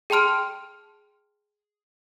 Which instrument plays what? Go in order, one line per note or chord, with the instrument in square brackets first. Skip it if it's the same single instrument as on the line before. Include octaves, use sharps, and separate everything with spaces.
[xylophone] G#4 G5 A5 C6 F6 D7